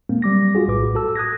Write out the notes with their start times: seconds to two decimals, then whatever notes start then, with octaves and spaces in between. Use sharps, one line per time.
0.09 A#2 G#3 A#3 C4
0.22 F#3 G3 D6 A#6
0.55 F4 F#4 G#4
0.68 A#1 A2 B4 D6
0.95 F#4 A4 A5 E6
1.16 D#6 F#6 G#6 A#6